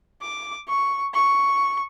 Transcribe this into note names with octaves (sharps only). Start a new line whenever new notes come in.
D6
C#6
C#6